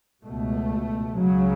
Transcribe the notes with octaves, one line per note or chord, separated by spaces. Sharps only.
C#2 B2 A3
C#2 C#3 F#3